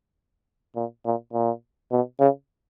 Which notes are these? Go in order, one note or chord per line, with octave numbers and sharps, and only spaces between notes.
A#2
A#2
A#2
B2
C#3